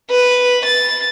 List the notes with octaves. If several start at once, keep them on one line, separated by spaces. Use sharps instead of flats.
B4
A6